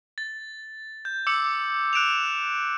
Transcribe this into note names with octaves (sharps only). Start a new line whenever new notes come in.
A6
G6
D6 E6 C#7
F#6 D7 E7 F7